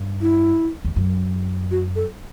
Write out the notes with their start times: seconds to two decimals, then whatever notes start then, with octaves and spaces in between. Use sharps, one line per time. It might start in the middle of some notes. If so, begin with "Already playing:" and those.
Already playing: G2
0.21 E4
0.85 E2
0.96 F#2
1.71 F#4
1.96 A4